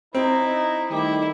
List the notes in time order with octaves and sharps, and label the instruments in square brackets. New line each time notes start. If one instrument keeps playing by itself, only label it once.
[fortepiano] C4 [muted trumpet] D#4 [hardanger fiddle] E4
[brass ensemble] D#3 G3 A3 [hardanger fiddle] E4 [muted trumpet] G4